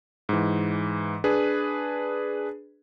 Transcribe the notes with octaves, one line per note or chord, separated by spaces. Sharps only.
G#2 E3
D4 G#4 B4